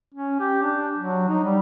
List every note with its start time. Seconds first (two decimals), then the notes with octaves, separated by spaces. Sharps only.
0.14 C#4
0.40 G4
0.62 D4
0.98 F#3
1.29 D#4
1.44 G3